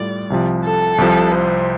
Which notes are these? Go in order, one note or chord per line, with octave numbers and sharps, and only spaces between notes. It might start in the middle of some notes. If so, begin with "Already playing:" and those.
Already playing: A2 G3 F4 A4 D5
C2 C3 F3
A4
C2 C3 F3
C5